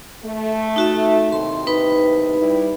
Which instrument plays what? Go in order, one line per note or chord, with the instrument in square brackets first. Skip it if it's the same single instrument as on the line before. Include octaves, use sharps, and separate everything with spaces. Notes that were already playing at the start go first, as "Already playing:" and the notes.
[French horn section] A3
[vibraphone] D#4 F#4 E5
[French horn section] D#2 A2 C3 [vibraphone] C6
[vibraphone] D#4 B4 B5
[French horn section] G3 E4